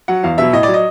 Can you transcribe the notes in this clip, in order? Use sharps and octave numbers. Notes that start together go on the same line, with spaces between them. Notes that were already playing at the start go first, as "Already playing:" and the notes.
F#3 F#5
E2 F5
B2 F#3 E5
A2 D#5
F#3 D5
D#5